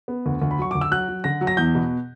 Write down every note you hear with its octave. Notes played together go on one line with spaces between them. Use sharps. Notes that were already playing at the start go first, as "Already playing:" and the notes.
B3
D2
D2
B5
F#3 C#6
D2 D6
E6
F#3 F#6
F#3
D3 A#6
F#3
A#6
E2 G6
B2